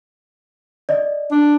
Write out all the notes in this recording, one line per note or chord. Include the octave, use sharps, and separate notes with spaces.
D5 D#5
D4